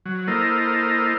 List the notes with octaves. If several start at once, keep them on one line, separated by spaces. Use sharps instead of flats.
F#3
A#3 E4 A4 A#4 C5 D#5